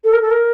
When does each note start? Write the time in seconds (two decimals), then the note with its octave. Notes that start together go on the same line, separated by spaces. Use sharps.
0.04 A4
0.13 A#4
0.21 A4
0.30 A#4